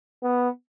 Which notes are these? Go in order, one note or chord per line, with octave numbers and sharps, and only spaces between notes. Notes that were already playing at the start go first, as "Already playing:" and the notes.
B3